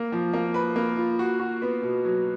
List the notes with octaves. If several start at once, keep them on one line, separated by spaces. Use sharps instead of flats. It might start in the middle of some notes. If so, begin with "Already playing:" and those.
Already playing: A#3
F3
A#3
B4
A#3
F4
F#4
F#4
B3
B2
F#3